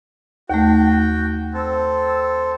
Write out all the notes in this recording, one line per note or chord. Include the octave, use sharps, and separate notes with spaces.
D#2 A3 F#4 G5
C4 A4